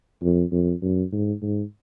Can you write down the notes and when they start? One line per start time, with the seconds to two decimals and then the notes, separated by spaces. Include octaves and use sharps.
0.23 F2
0.52 F2
0.82 F#2
1.12 G#2
1.42 G#2